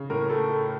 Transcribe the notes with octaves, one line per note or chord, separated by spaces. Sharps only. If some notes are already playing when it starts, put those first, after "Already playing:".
Already playing: C#3
A2 A#4
A3 A4
A3